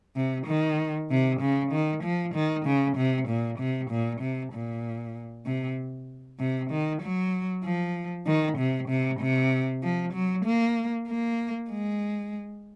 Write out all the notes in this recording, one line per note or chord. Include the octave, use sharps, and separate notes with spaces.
C3
D#3
C3
C#3
D#3
F3
D#3
C#3
C3
A#2
C3
A#2
C3
A#2
C3
C3
D#3
F#3
F3
D#3
C3
C3
C3
F3
F#3
A#3
A#3
G#3